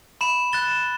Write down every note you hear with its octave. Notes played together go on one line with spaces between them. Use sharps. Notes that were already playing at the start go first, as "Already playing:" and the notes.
B5 E7
F#6 A6 E7 G7